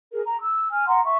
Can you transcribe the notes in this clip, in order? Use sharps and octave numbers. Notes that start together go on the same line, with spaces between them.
G#4 A#4
A#5
E6
G#5 F6
F#5 A#5 C6
E5 C#6